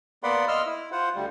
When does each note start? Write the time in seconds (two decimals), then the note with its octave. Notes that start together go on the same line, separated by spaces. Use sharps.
0.23 A#3 B3 D5 F#5 B5 C6
0.48 D#5 C6 E6 F6
0.66 E4
0.92 F4 C5 F#5
1.15 D2 G3